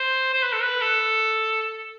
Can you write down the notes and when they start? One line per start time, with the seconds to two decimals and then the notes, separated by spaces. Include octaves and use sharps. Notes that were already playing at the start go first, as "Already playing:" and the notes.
Already playing: C5
0.33 C5
0.43 B4
0.53 A4
0.63 B4
0.81 A4